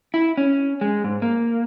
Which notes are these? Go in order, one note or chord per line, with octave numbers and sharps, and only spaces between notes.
E4
C#4
G#3
G#2
A#3